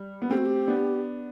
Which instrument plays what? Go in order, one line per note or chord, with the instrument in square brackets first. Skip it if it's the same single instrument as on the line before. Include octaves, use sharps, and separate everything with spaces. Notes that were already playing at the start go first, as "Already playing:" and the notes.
Already playing: [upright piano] G3
B3
[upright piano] A3 C4 [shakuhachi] G4
[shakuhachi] F#4
G4
[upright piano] B3 D4